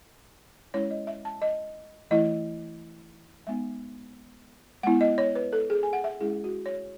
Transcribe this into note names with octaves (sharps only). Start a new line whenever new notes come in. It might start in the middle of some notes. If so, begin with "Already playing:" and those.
G#3 C#4 E4 C#5
D#5
E5
A5
D#5
E3 A3 E4 D#5
G#3 B3 D#4 E5
G#3 B3 E4 F#5
D#5
C#5
B4
A4
G#4
G#5
F#5
E5
G#3 C#4 E4 G#4
F#4
C#5